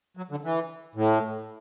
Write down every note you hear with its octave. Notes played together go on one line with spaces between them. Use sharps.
F#3
D3
E3
A2